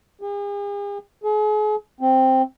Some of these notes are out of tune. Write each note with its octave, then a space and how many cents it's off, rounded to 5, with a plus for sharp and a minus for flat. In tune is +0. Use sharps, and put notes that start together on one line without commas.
G#4 -45
G#4 +40
C4 +0